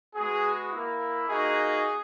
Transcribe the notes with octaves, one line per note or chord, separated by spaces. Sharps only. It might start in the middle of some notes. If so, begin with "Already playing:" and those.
G#3 B3 F#4 G#4
A#3 E4
A#3 D#4 F#4 G#4